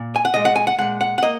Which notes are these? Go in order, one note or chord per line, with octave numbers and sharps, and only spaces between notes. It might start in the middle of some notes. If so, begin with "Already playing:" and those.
Already playing: A#2
G#5
F#5
A#2 G#3 D#5
F#5
G#5
F#5
A#2 G#3 F#5
F#5
F#5
A#3 D#5